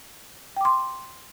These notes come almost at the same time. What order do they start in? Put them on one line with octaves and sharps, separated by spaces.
G5 D6 C6